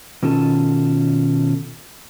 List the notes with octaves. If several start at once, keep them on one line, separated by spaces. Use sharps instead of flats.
B2 D#3 C#4 F4 A4